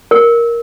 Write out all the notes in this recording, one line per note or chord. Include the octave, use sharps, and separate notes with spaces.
A#4